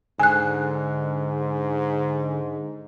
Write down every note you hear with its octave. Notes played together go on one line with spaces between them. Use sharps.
G#2 D3 G#5 F#6